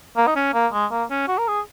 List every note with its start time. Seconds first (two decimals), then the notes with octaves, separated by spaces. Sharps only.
0.17 A#3
0.27 D#4
0.36 C#4
0.54 A#3
0.73 G#3
0.91 A#3
1.11 C#4
1.28 F#4
1.39 A#4
1.48 G#4